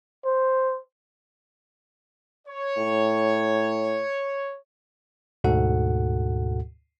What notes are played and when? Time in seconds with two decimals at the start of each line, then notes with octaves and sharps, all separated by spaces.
0.25 C5
2.47 C#5
2.77 A2
5.44 D2 G#2 B2 F#4 A4 F#5